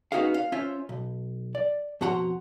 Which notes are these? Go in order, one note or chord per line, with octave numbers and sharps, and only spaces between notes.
B3 C#4 D#4 F#4 G#4 F5
F5
C#4 F4 C5 C#5 E5
B1
D5
F2 B2 F#4 F#5 A#5 C6